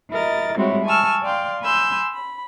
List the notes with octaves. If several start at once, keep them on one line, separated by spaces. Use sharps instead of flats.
E4 A#4 D#5 A6
G3 G#3 C4 E4 F#4 C#5
G#5 A5 C#6 E6 F6
D5 F5 G5 C6
G#5 B5 C6 E6 G6
B5